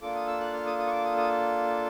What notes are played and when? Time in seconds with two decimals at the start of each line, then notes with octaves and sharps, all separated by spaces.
0.02 A#3 D4 F4 A4 D6
0.15 D#6
0.27 E6
0.41 F#6
0.53 F6
0.66 D#6
0.78 D#6
0.87 C#6
0.91 D6
1.04 D#6
1.17 D#6